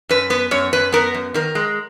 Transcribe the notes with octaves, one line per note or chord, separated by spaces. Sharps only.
F#2 B4
B3 B4
F#2 C#5
F#2 B4
B3 A#4
F#2
D#3 A#4
G#3